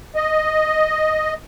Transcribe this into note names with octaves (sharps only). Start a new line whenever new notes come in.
D#5